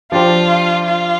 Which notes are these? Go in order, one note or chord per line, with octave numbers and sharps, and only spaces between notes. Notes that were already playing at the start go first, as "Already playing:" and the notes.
F3 D4 F4 G4 C5
F4